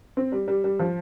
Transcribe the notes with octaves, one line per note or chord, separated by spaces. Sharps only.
C4
G3
G3
G3
F3